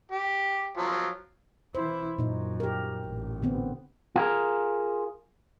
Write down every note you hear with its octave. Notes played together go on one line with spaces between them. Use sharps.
G4
F3 F#3
E3 E4 C5
F#2 A#2 D#4
G4 A#4
A1
D3 B3 C4
F4 G#4 A#4